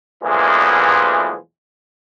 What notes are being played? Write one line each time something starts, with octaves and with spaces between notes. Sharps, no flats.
B1 E2 A#2 E3 F3 G#3